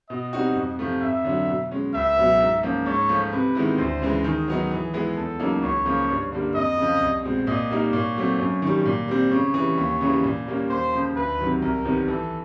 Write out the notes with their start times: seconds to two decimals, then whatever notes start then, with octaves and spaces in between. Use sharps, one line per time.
0.09 B2 D#5
0.33 G3 C4 D#4 F#4
0.55 F2
0.79 C3 F3 A3
1.02 F2 E5
1.24 D3 F#3
1.48 B2
1.71 G#3 C#4
1.94 C#2 E5
2.17 B2 F#3 B3
2.40 G#2
2.63 F3 A#3 C#4
2.86 G#2 C#5
3.09 F3 A3
3.32 C3 B4
3.55 D#3 G#3 B3 E4
3.78 D2 C5
4.01 C#3 E3 G#3
4.24 D#3 G#4
4.48 F#3 B3 D#4
4.71 E3
4.93 G#3 B3 E4 G#4
5.16 E2 A4
5.40 C#3 F#3 A#3 D#4
5.62 C#2 C#5
5.85 C#3 F3 A#3
6.09 G2
6.32 D3 G3 A#3
6.55 F2 D#5
6.77 C#3 F3
7.01 C2
7.23 B2 G#3 C4
7.47 A#2 D#5
7.70 G3 A#3 D#4
7.93 A#2 C#5
8.16 F#3 A3 C4
8.39 F#2
8.62 D#3 G3
8.85 A#2
9.08 G3 C4
9.31 C#3 C#5
9.54 E3 G3
9.78 D#2
10.01 C#3 E3 G3
10.24 A#2
10.47 G3 A#3 C#4
10.69 D#2 C5
10.93 C#3 F3
11.15 D2 B4
11.39 C3 D#3 F#3
11.62 C2 A#4
11.85 C3 D#3 G3 B3
12.08 E3 A4